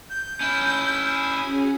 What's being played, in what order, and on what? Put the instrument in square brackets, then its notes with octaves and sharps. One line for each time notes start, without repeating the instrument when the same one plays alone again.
[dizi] G6
[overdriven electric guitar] C#4 E4
[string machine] G#5 D#6
C#4 F#4 G#4